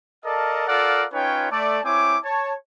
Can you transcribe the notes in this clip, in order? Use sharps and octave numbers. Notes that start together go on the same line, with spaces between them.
A4 A#4 D5 D#5 F5 A5
F4 A4 A#4 D5 F5 F#5
C#4 D#4 F4 B4 C#5 G5
A3 D5 A5
C4 E4 C#5 G#5 D6
C#5 A5